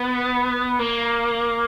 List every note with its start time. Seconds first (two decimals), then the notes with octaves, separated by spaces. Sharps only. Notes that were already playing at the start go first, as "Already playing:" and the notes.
Already playing: B3
0.79 A#3